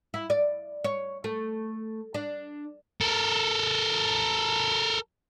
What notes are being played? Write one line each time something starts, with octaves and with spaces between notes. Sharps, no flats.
E4
D5
C#5
A3
D4
A4 A#4